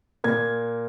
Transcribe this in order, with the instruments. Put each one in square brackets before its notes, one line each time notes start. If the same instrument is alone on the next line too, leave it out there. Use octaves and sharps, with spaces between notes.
[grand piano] A#2 A#3 G#6